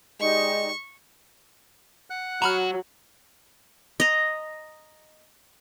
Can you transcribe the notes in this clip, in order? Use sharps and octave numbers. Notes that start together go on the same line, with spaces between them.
G#3 D#4 G4 D5 C#6
F#5 F#6
F#3 F#4 A#5 B5 F6
D#5 A#5